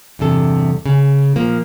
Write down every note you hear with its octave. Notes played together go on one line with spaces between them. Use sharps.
E2 G2 C3 A4
C#3
A#2 F3 A#3